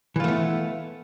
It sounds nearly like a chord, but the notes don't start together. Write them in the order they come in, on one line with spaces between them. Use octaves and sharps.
E3 F4 A3 B3